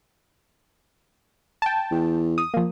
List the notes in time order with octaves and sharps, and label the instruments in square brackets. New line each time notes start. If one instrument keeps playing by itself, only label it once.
[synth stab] G5 A5
[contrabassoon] E2
[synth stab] D#6
F3 A#3